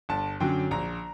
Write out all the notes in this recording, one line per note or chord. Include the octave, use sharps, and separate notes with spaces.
G1 A5
F#2 D3 F#3 G5
A#1 A#5